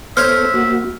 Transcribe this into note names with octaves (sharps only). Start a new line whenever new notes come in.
B3 A4 C5 C#5 E5 F6
A#3 F#4